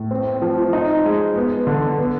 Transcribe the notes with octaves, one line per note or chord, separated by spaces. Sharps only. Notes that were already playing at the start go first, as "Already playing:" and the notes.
Already playing: A2
C4
F3
D#4
G#3
B3
D3
B3